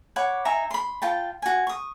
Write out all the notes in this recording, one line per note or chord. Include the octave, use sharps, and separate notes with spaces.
C#5 F#5 B5 D6
D#4 E5 G#5 A#5
B5 C6
F4 G5 A5
F#4 G#5
C#6 D#6